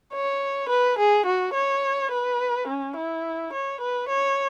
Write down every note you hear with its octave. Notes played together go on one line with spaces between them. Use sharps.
C#5
B4
G#4
F#4
C#5
B4
C#4
E4
C#5
B4
C#5